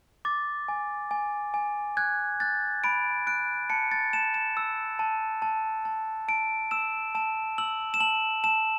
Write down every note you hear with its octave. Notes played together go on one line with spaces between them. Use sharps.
D6 A6
G#5
G#5
G#5
F#6 G#6
F#6 A6
B5 D7
F#6 D7
A5 C#7
A6
A5 E7
E7
E6
A5
A5
A5
A5 D7
E6 E7
A5 E7
E6 F#7
E7
A5 F#7
A5 E7